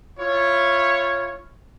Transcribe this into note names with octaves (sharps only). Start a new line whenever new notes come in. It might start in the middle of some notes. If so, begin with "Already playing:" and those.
E4 F4 C#5